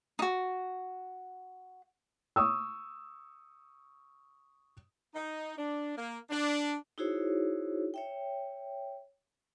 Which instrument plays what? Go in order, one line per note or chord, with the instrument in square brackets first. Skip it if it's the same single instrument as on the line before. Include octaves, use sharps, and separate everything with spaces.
[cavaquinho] D#4 F#4
[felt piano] C#6 D#6 E6
[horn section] D#4
D4
A#3
D4
[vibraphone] D#4 E4 F#4 G#4 C5 C#5
C#5 E5 G5